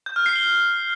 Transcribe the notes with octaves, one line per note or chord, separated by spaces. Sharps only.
G6
F6
C7
G7